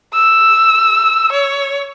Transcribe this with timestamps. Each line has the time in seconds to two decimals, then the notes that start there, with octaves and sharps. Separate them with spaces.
0.14 E6
1.32 C#5